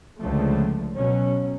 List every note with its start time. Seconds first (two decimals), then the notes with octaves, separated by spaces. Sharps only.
0.20 C#2 D3 F3 A3
0.97 B2 F#3 C#4